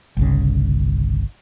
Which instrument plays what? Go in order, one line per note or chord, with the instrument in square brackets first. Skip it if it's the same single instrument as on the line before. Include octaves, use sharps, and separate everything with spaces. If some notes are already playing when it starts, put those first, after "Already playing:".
[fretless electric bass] G1 C2 C#3